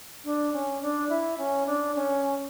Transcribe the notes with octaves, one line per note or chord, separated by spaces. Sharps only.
D4
C#4
D4
E4
C#4
D4
C#4